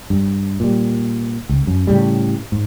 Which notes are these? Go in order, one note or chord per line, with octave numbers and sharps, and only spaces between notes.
G2
A#2 G3
C#2
F#2
A2 C#3 G3
G#2